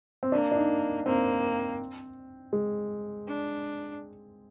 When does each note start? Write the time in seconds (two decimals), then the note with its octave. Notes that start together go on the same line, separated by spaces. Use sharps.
0.23 C4
0.32 A#3 D4
0.52 D4
0.56 D#4
1.06 A#3 C4
2.53 G#3
3.27 D4